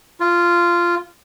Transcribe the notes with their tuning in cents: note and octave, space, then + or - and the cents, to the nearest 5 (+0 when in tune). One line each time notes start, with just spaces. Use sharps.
F4 -10